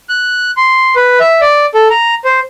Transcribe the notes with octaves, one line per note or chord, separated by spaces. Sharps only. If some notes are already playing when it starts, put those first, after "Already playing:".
F#6
C6
B4
E5
D5
A4
A#5
C5